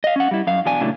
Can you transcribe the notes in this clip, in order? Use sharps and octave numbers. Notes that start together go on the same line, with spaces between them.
D#5 F5
C#4 F#5
G3 E4
F#2 F5
E2 B2 D4 G#5
A#2 C#3 F#3 A3 D4 E4